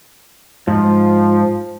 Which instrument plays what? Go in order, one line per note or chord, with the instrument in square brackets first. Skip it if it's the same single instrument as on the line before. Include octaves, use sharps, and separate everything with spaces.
[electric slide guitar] G#2 [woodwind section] F3